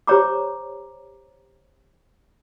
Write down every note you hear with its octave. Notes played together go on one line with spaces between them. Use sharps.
G4 C5 C#5 A#5 D6